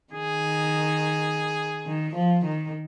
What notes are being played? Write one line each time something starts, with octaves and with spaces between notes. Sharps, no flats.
D#3 G#4
D#3
F3
D#3